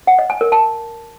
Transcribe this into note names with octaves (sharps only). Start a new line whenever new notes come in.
F#5
D#5
G#5
A#4
A5